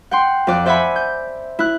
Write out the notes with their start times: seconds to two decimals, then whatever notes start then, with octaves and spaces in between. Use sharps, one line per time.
0.11 F#5 G5 C6
0.47 F2 D5 F#6
0.65 C5 D5 E5 F#5 G#5 B5
0.96 G6
1.59 E4 F#6